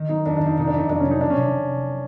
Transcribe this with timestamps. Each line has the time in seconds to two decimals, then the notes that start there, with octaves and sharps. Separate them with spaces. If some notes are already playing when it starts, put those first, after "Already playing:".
Already playing: D#3
0.09 F#3 D#4
0.25 F2 D4
0.36 D4
0.41 F2
0.47 D#4
0.57 C3 D#4
0.67 D4
0.74 F2 D#4
0.89 F#3 D4
1.00 C#4
1.05 F#3
1.11 D#4
1.21 C3 D4
1.30 C#4
1.37 C3